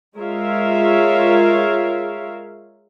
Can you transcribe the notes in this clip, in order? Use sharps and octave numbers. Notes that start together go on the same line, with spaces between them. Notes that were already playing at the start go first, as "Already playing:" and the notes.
G#3 F4 A#4 C#5 E5 F5